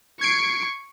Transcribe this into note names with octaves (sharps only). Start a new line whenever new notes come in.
C#6 G#6 C7 D7